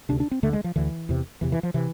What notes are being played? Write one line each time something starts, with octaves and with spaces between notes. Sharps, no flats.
D2 C3 D4
D4
C4
D2 D3 A3
G#3
F3
D2 D3 E3
E2 C3
E2 C3 E3
E3
F3
C3 E3